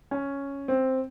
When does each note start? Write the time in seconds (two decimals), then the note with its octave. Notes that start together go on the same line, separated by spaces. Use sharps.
0.11 C#4
0.68 C4